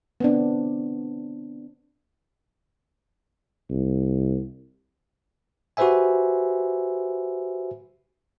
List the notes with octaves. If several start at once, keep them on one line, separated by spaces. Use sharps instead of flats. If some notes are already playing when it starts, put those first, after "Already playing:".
B3 C4 D4
C2
F#4 G4 B4 C5 E5 G#5